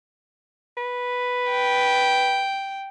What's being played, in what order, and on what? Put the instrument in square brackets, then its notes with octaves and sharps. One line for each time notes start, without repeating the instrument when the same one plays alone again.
[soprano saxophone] B4
[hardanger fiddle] G5